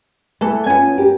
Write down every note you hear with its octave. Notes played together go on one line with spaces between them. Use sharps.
E3 A3 B3 A4
B3 C#4 F4 G#5
G4 A#4